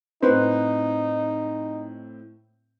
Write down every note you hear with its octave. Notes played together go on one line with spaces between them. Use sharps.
A2 C4 D#4 B4 C5